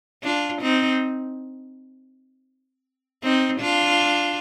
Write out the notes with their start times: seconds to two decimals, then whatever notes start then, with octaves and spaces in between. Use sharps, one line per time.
0.24 D4 F4
0.62 C4 D#4
3.23 C4 D#4
3.60 D4 F4